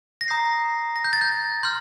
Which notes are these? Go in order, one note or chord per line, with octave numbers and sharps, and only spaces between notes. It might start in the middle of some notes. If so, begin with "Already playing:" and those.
A#6
A#5 D#6 G6 C7
A#6
G6
A6
G6
C6 F6 G6